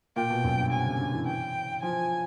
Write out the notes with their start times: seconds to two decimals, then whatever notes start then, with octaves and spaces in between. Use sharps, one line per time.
0.16 A#2 G5
0.30 B2
0.44 F#2
0.58 G2
0.72 C3 G#5
0.86 C#3
1.00 D3
1.13 E3
1.27 G5
1.82 F3 G#5